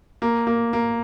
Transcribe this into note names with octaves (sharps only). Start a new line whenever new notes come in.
A#3
A#3
A#3